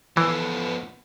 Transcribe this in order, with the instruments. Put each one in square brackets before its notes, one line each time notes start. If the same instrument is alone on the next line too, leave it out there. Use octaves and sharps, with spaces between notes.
[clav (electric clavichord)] E3 [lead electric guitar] F3 B3 [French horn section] F4 A4 B4